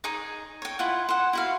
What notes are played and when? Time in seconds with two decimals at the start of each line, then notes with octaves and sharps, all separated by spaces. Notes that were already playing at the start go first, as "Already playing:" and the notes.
0.04 D#4 G#4 C#5
0.62 C#5 G5
0.79 E4 F4 F#5
1.09 C5 F#5
1.33 E4 F#4 F5